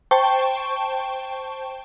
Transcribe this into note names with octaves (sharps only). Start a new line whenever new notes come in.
C5 G5 A5 C#6